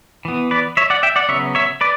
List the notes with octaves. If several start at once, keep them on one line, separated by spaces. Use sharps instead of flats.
E3 B3
B4 D5
C#5 E5
D5 F#5
E5 G5
D5 F#5
C#3 F#3 B3 C#5 E5
C#5 E5
B4 D5